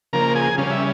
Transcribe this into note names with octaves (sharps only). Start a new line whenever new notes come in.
C#3 F3 A#3 A#4 A#5
G#4 G#5
C#3 G3 C#4 F5
E5